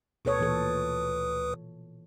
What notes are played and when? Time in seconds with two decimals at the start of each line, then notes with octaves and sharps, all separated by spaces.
0.25 D2 B2 A4 B4 C#5 D#6
0.39 A#2 E3 A4